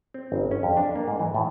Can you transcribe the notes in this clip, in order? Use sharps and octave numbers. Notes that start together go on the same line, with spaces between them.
C4
G1
C#4
F2
D4
A#3
G#2
E3
A2